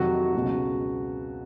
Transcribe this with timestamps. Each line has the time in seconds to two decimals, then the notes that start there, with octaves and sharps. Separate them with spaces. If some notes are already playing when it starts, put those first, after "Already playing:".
Already playing: F2 C3 D#3 F#3 F#4
0.34 C#2 B2 F#3